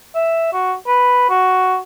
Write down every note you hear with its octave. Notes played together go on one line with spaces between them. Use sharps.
E5
F#4
B4
F#4